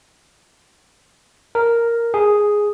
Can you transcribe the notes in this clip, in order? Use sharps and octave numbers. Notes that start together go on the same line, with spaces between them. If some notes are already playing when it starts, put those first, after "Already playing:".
A#4
G#4